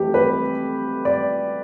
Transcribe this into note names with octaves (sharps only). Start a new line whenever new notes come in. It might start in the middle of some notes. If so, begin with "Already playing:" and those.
Already playing: F2 E3 A3 G4
B4
D5